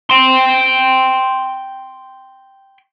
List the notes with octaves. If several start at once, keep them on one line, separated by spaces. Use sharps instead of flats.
G5 C6